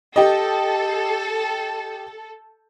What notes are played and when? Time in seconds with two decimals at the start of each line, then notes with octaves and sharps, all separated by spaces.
0.16 G4 A4 D#5